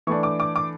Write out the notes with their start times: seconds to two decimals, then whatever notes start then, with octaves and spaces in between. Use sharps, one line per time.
0.07 E3 A3 D4 C#6
0.23 D6
0.40 D6
0.56 D6